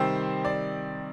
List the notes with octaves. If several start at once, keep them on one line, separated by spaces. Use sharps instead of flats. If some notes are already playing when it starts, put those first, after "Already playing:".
Already playing: C3 D#3 G3 C4 C5
D5